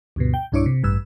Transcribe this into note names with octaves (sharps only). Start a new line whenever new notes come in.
D2 G2 B2
G5
B1 G2 D4 E4 C#5 D6
C3
A1 G2 B4 E6